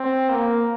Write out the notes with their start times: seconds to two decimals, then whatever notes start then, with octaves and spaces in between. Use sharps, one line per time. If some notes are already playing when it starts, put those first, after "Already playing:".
Already playing: C4
0.30 A#3